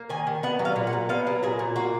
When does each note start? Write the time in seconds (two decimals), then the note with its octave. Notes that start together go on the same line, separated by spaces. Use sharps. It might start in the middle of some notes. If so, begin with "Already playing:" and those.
Already playing: A#3
0.10 D#3 G#5
0.27 D#3
0.43 B3 F#5
0.59 F#3
0.65 F5
0.76 A#2
0.87 F#5
0.93 A#2
1.09 B3 F5
1.27 F#3
1.43 A#2 G#4
1.59 A#2
1.76 A#3 F#4